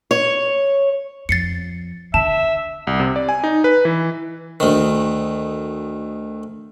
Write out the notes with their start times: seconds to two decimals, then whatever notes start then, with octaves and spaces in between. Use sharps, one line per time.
0.11 C#5
1.29 F2 A6 C7 C#7
2.14 D3 E5 A5
2.87 C2
3.00 C3
3.16 D5
3.29 G#5
3.44 D#4
3.64 B4
3.85 E3
4.60 D2 D#3